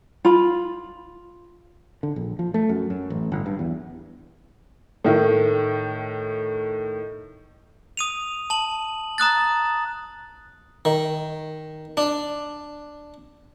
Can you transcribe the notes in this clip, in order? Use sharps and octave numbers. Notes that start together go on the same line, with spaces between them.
F4 B5
D3
A#1
F3
A3
F#2
F#2
A1
G1
G2
E2
A2 D#3
D#6 D#7 F7
A5 F#7
A#5 D#6 F#6 A6
D#3
D4